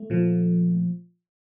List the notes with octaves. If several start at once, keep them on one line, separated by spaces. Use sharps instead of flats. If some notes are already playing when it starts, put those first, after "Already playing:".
Already playing: A3
A#2 F3